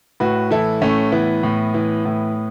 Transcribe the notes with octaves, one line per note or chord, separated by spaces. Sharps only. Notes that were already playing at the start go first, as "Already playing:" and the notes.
A2 F#4 B4
E3 E4 A4
A2 A3 C#4
E3 B3
A2
E3
A2